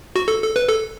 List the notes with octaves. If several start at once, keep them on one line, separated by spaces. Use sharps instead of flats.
F#4
A4
A4
B4
A4